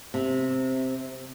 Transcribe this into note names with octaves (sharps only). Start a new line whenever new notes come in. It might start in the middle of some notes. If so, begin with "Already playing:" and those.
C3